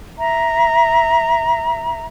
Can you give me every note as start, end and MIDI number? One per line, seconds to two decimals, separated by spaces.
0.18 2.05 76
0.18 2.05 82